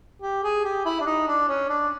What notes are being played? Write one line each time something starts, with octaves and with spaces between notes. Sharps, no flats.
G4
G#4
G4
E4
D4
D#4
D4
C#4
D4